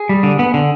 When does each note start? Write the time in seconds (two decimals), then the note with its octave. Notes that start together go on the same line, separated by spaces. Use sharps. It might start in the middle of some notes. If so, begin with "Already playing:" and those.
Already playing: G#4
0.09 G3
0.23 D3
0.39 B3
0.54 D3